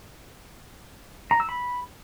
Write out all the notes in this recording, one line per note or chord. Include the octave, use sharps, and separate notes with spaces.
A#5
E6
B5